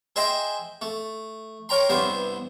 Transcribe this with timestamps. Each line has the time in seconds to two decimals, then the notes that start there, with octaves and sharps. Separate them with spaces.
0.16 G#4 C5 D#5 E5 G5 G#5
0.82 A3
1.69 A#4 C#5 G5 A#5 C6
1.89 C2 G2 B3 C5 E5